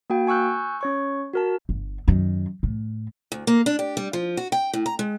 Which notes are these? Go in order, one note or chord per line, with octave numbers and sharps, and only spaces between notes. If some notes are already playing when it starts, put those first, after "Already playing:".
A#3 F#4 G5
G#5 C#6 E6 F#6 G6
C#4 C#5 C#6
F#4 A#4 A5
G1
F#2 D#3
A2
D2
A#3
D4
G4
G3
F3
F#4
G5
A2
A#5
G#3